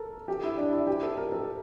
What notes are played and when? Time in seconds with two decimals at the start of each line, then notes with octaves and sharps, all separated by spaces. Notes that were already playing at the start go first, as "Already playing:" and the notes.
Already playing: A4 A#4
0.28 G4
0.44 E4
0.57 D4
0.73 E4
0.87 G4
1.03 A4
1.18 A#4
1.32 A4